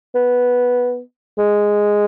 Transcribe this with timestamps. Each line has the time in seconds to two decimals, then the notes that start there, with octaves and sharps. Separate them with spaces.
0.15 B3
1.38 G#3